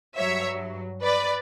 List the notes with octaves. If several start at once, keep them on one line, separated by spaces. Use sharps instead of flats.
G2 F#3 C#5 E5
B4 D5